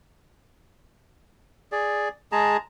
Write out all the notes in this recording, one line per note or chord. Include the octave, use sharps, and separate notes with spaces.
G#4 D5
G#3 G#4 A5 A#5